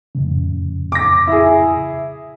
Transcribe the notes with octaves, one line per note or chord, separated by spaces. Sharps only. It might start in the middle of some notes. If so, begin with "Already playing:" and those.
F2 A2 C#3
D6 A#6
E4 G#4